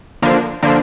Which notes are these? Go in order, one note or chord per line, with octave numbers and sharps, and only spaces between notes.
D3 F3 A#3 D4
D3 F3 A#3 D4